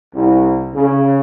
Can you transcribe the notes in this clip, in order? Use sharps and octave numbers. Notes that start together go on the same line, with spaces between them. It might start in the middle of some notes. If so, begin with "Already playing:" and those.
C2
C#3